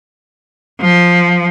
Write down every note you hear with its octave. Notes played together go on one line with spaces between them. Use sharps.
F3